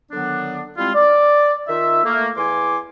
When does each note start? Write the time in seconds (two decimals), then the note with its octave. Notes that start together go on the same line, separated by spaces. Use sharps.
0.12 D3 D#3 F#3 B3 D4
0.77 G3 G#3 C4 E4 F4
0.94 D5
1.68 D#3 D#4 F4 E5
2.04 A3 A#3
2.37 E2 E4 G#5 C6 D6